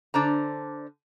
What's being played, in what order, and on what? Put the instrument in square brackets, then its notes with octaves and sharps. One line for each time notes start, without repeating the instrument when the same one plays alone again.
[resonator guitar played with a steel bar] D3 D4 C5 A#5